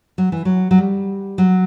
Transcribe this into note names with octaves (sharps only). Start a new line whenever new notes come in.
F#3
E3
F#3
F#3
G3
F#3